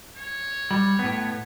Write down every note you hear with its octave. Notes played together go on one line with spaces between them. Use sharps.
C#5
G3
A2 B3